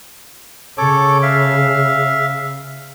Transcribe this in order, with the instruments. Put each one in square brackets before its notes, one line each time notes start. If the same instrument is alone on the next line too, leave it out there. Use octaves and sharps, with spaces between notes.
[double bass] C#3 [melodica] A4 C#5 D6
[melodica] E5 F5